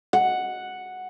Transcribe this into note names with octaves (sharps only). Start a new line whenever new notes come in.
F#5